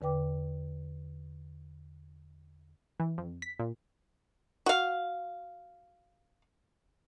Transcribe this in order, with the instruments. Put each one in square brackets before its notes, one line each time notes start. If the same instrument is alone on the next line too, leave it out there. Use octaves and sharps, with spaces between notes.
[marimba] E2 D3 B4 G5 D6
[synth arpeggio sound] E3
F2
B6
A#2
[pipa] F#4 F5